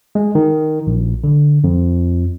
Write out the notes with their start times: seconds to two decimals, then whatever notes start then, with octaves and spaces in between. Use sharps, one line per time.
0.15 G#3
0.35 D#3
0.87 A#1
1.24 D3
1.64 F2